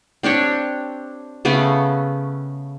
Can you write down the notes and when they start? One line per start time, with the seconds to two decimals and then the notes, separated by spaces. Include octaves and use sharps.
0.23 C4 D4 G4 C#5
1.45 C#3 A3 B3 C#4